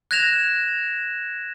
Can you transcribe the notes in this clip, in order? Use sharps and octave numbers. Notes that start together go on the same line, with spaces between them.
F#6 G#6 A#6 E7 F7